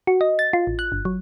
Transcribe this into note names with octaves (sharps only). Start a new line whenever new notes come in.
F#4
D#5
A6
F4
A1
F#6
G1
F#3